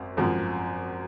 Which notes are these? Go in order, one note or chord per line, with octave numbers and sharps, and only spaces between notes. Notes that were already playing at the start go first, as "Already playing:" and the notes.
Already playing: G#1 F#2 C4
G#1 F#2 F3 C4